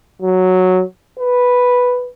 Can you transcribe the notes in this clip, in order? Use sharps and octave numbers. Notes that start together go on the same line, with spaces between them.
F#3
B4